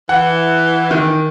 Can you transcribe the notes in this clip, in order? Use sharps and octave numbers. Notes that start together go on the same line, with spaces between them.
E3 F#5
D#3